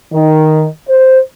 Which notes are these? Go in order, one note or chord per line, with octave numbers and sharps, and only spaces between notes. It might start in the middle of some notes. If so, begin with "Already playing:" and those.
D#3
C5